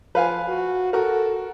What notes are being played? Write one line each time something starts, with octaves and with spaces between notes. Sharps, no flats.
F3 B4 F5 G#5
F#4
F#4 A4 A#4